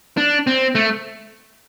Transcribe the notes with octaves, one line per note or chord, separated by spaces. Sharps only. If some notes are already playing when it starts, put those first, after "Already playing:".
D4
C4
A3